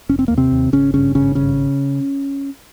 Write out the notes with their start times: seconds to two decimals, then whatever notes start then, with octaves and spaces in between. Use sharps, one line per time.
0.09 F1 C#4
0.19 C4
0.28 D#2 A#3
0.37 C3 C4
0.52 D#2
0.72 G#1 C#3 C#4
0.94 G2 C#3 C#4
1.15 G#1 C#3 C#4
1.35 G2 C#3 C#4